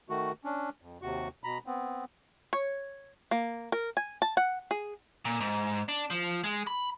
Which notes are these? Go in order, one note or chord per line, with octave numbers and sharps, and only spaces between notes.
D#3 A3 F#4
C#4 D4
F2
D#2 C3 F#4 C#6
B2 A#5 B5
B3 C4
C#5
A#3
A#4
G#5
A5
F#5
G#4
A#2
G#2
D4
F3
G#3
B5